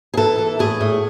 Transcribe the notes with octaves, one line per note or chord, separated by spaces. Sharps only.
G#4
E3 A4
E3
A2 G#4
A2